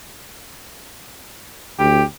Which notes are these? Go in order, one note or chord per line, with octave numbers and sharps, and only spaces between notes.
D2 G4